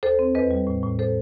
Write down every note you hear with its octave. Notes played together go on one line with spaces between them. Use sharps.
D#2 A4 C5
C4
E2 B4 D#5
G3
A2
A2
A4 C5